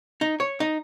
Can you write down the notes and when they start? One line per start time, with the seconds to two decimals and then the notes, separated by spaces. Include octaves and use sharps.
0.21 D#4
0.40 C#5
0.60 D#4